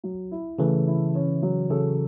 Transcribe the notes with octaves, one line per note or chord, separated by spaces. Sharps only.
F#3
E4
C#3 E3 A3
E4
C#4
F#3
C#3 A4